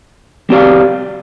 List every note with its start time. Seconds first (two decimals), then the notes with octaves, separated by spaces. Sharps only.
0.50 G3 C4 G4 D5 F5